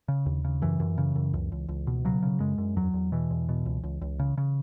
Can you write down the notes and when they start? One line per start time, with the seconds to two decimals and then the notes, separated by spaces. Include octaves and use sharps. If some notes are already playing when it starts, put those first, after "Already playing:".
0.08 C#3
0.26 D#2
0.44 C#3
0.62 F#2 E3
0.80 F#2
0.98 C#3
1.16 F#2
1.34 C#2
1.52 C#2
1.69 C#2
1.87 B2
2.05 C#3 F#3
2.23 C#3
2.40 F#2 G#3
2.58 F#2
2.76 E2 F#3
2.94 E2
3.12 B2 E3
3.31 E2
3.49 B2
3.66 C#2
3.84 C#2
4.02 C#2
4.19 C#3
4.38 C#3